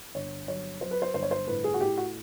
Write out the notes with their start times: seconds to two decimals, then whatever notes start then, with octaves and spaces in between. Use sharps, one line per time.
0.15 G1 C#5
0.48 F#3 C#5
0.81 F#3 C5
0.91 B4
1.02 C5
1.14 G1 C5
1.23 C#5
1.31 C5
1.48 A2 B4
1.64 G#4
1.74 F#4
1.81 A2 G4
1.97 F#4